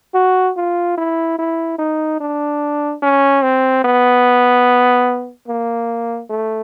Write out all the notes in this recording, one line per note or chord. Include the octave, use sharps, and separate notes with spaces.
F#4
F4
E4
E4
D#4
D4
C#4
C4
B3
A#3
A3